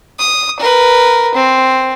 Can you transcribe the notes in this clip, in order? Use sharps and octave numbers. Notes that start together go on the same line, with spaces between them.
D#6
A#4 B4
C4